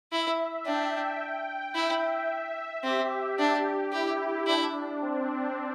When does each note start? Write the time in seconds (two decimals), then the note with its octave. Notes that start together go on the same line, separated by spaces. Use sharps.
0.11 E4 E5
0.65 D4 G5
1.74 E4 E5
2.84 C4 G4
3.39 D4 G4
3.93 E4 G4
4.47 D4 E4
5.01 C4